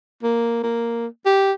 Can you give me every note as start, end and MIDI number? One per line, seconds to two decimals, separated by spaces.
0.23 0.61 58
0.63 1.06 58
1.26 1.52 67